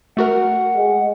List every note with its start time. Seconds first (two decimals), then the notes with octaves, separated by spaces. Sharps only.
0.17 A3 F#4 A#4 F#5
0.76 G#3